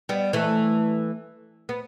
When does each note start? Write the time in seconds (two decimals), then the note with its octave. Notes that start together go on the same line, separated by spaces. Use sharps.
0.09 G3 B3
0.33 E3 A3
1.69 B3